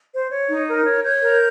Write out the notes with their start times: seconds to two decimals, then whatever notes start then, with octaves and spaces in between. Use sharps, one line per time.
0.12 C5
0.30 C#5
0.49 D#4
0.67 A#4
0.85 C#5
1.04 C#5 G6
1.22 A#4